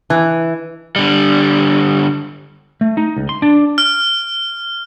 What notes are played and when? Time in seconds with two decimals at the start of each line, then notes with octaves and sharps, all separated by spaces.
0.10 E3
0.96 D3 G3
2.81 A3
2.97 D#4
3.17 C#2
3.29 C6
3.42 D4
3.78 F6